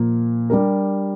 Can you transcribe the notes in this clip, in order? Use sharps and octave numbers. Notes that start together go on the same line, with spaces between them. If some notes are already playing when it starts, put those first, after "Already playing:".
Already playing: A#2 F3 A#3
G3 D4 G4 A#4